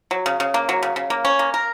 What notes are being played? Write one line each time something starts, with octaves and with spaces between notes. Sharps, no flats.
F#3
C#3
C#3
A#3
F#3
C#3
C#3
A#3
C#4
A#3
A#4